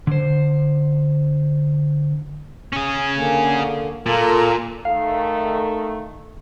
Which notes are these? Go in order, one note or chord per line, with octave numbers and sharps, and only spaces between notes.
D3 C5
C#4 G#4
D3 A#3
A#2 F4 A4 A#4
D#3 A3 F5